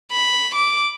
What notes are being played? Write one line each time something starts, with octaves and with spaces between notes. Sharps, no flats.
B5
D6